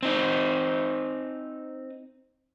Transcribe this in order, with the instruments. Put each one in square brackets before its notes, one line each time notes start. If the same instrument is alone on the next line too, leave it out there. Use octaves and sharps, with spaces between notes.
[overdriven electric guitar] C4 D#4